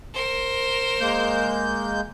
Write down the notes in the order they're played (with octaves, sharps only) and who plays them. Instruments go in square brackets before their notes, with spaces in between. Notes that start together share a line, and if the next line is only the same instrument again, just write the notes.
[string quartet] A#4 C5
[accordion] G#3 A#3 G6